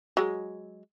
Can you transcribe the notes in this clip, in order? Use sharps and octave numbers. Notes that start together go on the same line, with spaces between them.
F#3 G#3